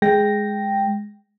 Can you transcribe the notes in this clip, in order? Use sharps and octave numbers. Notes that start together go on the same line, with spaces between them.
G#3 G5 A#6